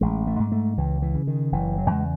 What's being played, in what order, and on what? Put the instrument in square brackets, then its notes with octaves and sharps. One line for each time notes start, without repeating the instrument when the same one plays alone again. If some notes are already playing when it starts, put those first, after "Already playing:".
[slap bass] A1 G#3
A3
G#2
A3
C#2 E3
E3
C#3
D#3
F#1 E3
F#3
E2 C#3 G#3